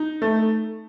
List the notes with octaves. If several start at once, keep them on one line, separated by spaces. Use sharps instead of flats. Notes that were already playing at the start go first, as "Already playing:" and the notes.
Already playing: D#4
A3